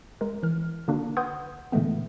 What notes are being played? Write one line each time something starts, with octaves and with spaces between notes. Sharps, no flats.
G#3 A#4
E3 F6
D3 A#3 D4 F#4
B4 F#5 C6 D#6 G6 G#6
A#2 D3 E3 G#3 A3 B3